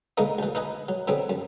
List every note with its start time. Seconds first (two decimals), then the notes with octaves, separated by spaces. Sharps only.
0.17 D3 G#3 A#3 B3 D#4
0.39 D2 E3
0.55 D#4 B4 D#5 G#5
0.89 F#3
1.07 D3 F#3 B3 C4 G#4
1.30 F#2